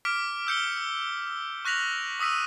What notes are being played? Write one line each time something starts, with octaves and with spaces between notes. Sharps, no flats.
D6 F6 B6 D7
E6 G6 C#7 G7
C#6 F#6 A#6 B6 F7 F#7
C#6 D#6 E6 B6 D#7